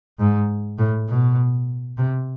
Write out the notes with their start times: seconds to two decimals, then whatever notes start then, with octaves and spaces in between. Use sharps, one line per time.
0.19 G#2
0.78 A2
1.08 B2
1.98 C3